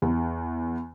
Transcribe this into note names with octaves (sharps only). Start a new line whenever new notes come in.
E2